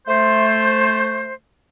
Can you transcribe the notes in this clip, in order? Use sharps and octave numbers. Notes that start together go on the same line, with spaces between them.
A3 C5